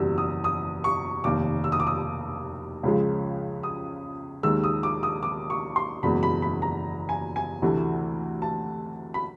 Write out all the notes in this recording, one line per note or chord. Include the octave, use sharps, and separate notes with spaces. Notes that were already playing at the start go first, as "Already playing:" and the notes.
Already playing: F#1 E2 B2 G3 E6
D#6
D#6
C#6
F1 D#2 D#3 D6
E6
D#6
D6
D#6
C#2 C#3 F3 G#3
D#6
D#2 D#3 G#3 E6
D#6
D6
D#6
D6
C#6
C6
F#1 E2 B2 G#3 B5
B5
B5
A#5
G#5
G#5
D2 C3 E3 A3
A5
B5